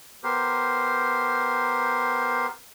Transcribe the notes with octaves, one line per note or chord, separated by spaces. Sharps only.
B3 G4 A#4 C5